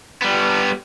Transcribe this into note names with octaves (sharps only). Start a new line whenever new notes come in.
G3 B3